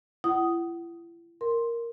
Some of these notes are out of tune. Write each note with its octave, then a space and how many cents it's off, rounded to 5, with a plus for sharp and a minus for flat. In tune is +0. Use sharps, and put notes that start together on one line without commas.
E4 +40 F#5 +30 D#6 +0
A#4 +0 C6 +0